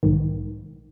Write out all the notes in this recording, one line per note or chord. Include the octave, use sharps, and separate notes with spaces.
B1 G#2 D#3